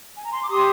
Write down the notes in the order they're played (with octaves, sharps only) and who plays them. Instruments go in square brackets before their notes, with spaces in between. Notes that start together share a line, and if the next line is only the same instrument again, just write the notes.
[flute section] G#5
A#5
C6
D6
G4 C6 D#6